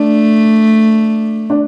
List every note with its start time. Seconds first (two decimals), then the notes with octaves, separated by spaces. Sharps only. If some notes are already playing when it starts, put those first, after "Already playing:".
Already playing: A3 D4
1.50 D4